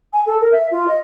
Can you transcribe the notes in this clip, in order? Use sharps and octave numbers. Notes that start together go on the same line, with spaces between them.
G#5
A4
A#4
E5
F4
D#5